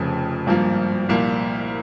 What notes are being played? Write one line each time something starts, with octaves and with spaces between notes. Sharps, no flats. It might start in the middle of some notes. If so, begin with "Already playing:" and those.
Already playing: F1 F2 C#3 F3
G#1 G2 F3 A#3
C2 A#2 F3 A#3